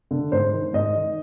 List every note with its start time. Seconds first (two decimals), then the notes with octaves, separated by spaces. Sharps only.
0.11 D3
0.32 G#2 C5
0.53 D#3
0.73 G#2 D#5
0.95 D#3